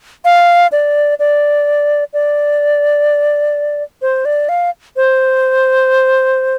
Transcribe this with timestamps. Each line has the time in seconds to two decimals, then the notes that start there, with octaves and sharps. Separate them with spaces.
0.25 F5
0.72 D5
1.19 D5
2.13 D5
4.02 C5
4.25 D5
4.49 F5
4.96 C5